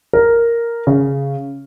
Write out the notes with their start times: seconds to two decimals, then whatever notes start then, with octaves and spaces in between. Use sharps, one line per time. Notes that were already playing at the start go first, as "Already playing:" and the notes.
0.13 A#4
0.87 C#3